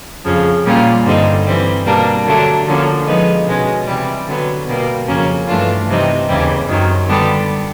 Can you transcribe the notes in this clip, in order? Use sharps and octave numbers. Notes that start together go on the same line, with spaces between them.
F2 C#3 F3
A#2 G3 A#3 C#4 F4
G2 D3 G3 C4 D#4
E3 G3 C4
B2 G3 A#3 D4
D3 F#3 A3 D4
D3 F3 A#3 C#4
F3 G#3 B3 D#4
B2 G#3 C#4
C3 E3 G3
D3 F#3 B3
B2 G3 A#3
F2 C#3 F#3 A#3 C#4
G2 E3 A3 D4 F4
C3 E3 G3 C4 D#4
D#2 C#3 E3 G3 C4
F#2 D#3 F#3
D3 G3 B3 D4 G4